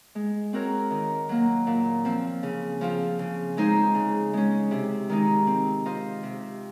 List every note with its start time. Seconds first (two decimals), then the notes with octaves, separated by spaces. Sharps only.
0.15 G#3
0.53 C4 F#4 A#4 C#5
0.91 D#3
1.29 F#3 A#3
1.67 A#2
2.05 F3 C4
2.43 C#3
2.81 F3 C4 F4
3.19 C#3
3.57 G#3 D#4 G#4 C5
3.95 C#3
4.33 G#3 C#4
4.71 C3
5.09 D#3 G#3 D#4
5.47 C4
5.85 F4 C5 D#5
6.23 C3